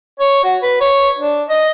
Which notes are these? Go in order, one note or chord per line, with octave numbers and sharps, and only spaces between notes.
C#5
F#4
B4
C#5
D4
D#5